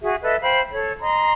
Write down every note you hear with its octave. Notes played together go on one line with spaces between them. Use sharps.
F#4 G#4 E5
A4 B4 D#5 E5
C5 F5 G5 B5
A4 C#5
D#5 A#5 C6